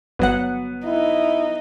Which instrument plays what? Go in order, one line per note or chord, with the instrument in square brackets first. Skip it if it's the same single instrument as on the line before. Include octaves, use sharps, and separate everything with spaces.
[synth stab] G1 F#3 F#5 [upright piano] B3
[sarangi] D#4 [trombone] E4